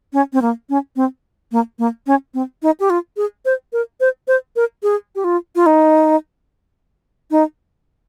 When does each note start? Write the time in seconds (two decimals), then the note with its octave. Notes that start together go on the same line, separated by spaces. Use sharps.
0.13 C#4
0.33 C4
0.42 A#3
0.70 C#4
0.96 C4
1.52 A#3
1.79 A#3
2.07 C#4
2.34 C4
2.63 D#4
2.80 G4
2.90 F4
3.17 G#4
3.45 C5
3.73 A#4
4.00 C5
4.28 C5
4.56 A#4
4.83 G#4
5.16 G4
5.24 F4
5.56 F4
5.66 D#4
7.31 D#4